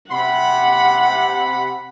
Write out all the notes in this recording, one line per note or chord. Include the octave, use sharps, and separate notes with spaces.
C3 F#5 B5